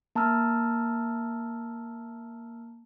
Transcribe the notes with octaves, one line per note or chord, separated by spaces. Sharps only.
A#3 A5 A#5 E6 F6